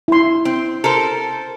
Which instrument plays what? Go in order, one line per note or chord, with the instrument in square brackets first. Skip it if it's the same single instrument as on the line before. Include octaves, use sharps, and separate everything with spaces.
[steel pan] E4 C6
[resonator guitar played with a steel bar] C4
A4 A#4 C5